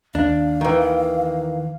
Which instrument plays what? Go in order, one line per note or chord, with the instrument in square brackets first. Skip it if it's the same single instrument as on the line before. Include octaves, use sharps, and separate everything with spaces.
[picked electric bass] D#2 [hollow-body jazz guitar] D4 [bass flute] F5
[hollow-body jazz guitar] D#3 E3